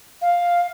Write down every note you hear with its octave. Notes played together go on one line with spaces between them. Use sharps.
F5